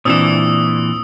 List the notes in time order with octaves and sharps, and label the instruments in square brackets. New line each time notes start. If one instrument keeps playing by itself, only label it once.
[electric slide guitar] A#2 D#3 E3 [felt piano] C4 D4 E7 [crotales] D#6 E6